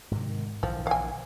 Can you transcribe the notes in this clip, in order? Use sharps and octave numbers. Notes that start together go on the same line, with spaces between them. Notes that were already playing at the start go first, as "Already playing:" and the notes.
G#2 C3 D#3
A#1 D3 E3 F3
F5 G#5